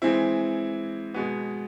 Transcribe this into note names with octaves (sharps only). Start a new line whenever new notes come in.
E3 G#3 C4 E4
B2 G#3 B3